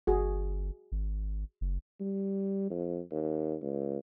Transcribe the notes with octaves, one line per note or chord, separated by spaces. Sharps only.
G1 F#4 G#4
G#1
F#1
G3
F2
D#2
C#2